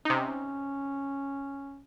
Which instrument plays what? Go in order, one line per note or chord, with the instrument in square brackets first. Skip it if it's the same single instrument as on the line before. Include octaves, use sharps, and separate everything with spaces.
[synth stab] C3 D#4 [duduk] C#4